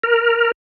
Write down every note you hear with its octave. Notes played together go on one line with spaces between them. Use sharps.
A#4